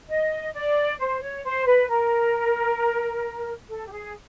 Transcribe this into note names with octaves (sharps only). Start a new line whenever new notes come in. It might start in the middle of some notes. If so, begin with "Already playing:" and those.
D#5
D5
C5
C#5
C5
B4
A#4
A4
G4
G#4